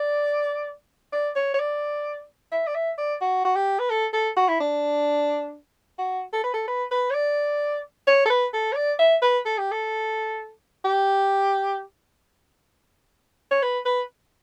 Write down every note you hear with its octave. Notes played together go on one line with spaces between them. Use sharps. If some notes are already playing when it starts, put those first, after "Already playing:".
Already playing: D5
D5
C#5
C#5
D5
E5
D5
E5
D5
F#4
F#4
G4
B4
A4
A4
F#4
E4
D4
F#4
A4
B4
A4
B4
B4
C#5
D5
C#5
A4
B4
A4
C#5
D5
E5
B4
A4
G4
A4
G4
C#5
B4
B4